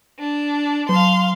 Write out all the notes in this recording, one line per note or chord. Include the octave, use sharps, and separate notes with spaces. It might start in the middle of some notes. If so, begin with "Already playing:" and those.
D4
F#3 F5 C6